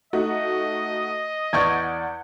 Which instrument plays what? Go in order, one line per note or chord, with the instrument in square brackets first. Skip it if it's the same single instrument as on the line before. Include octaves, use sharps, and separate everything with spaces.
[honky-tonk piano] A3 D#4 F#4 [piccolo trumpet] D#5
[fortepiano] E2 D5 C#6 [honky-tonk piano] F#5 G6 G#6